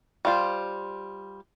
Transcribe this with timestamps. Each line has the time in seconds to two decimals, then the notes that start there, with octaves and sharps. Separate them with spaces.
0.25 G3 F4 C5